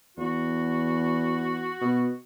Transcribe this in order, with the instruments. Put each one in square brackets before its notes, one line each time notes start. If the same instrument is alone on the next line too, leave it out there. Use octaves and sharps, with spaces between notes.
[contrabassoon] E2 [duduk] F#4
[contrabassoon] B2